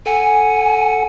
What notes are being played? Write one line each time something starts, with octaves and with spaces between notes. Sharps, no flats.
A4 F#5 G#5 C#7